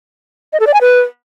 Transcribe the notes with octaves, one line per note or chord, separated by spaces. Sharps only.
D#5
A4
D5
G#5
B4